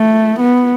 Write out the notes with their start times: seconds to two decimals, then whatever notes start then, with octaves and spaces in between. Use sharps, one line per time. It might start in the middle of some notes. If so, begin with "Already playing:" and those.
Already playing: A3
0.40 B3